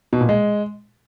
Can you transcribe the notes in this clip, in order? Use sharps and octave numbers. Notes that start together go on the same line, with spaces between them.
B2
A#2
G#3